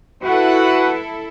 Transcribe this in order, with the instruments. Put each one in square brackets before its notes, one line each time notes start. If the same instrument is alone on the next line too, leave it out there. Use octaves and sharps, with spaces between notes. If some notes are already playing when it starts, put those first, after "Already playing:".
[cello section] E4 A4 [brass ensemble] F#4 F#5 [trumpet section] B4